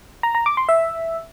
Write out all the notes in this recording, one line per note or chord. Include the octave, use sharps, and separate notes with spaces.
A#5
A#5
D6
C6
E5